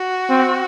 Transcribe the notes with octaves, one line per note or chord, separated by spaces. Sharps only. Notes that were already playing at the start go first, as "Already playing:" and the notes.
Already playing: F#4
C4